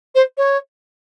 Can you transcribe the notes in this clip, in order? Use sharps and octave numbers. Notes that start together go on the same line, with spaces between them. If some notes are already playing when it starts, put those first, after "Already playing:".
C5
C#5